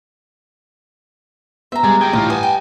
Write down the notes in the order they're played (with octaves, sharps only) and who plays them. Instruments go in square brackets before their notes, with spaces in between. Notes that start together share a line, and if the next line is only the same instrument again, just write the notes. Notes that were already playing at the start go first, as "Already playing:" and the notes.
[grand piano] B3 [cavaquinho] C5 A#5 [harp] E5
[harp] G3 [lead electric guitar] G#3 G#4
[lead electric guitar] G#4 A#4 [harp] G5
[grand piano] A2 E3 [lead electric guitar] D3 F4 [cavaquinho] D#4 [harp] D#5
[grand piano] B4 F#5 [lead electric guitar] G#5 A5 [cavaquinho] D#6
[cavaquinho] G5